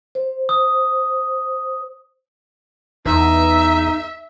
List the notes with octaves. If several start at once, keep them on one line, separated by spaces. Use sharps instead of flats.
C5
D#6
E2 D#4 E5